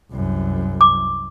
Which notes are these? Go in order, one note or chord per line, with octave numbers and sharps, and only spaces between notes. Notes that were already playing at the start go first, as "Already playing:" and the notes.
C2 F#2
D6